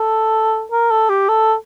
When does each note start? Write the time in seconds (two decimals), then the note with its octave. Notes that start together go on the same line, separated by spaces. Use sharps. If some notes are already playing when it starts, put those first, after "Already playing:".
Already playing: A4
0.72 A#4
0.90 A4
1.09 G4
1.29 A4